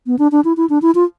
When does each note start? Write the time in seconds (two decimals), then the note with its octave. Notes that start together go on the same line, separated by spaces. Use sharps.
0.07 B3
0.19 D4
0.32 D4
0.45 E4
0.57 E4
0.70 D4
0.82 E4
0.95 F4